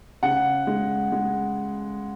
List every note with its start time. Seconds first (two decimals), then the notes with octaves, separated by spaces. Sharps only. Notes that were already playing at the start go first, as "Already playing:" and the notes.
0.23 C#3 F#5
0.67 G#3
1.12 G#3